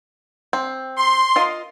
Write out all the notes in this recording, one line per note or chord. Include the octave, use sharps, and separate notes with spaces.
C4
C6
F4 A#4 D#5